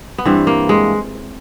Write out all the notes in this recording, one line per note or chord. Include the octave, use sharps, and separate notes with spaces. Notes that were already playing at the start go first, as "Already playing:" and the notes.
B3
G2 E3 G3 C4
A#3
G#3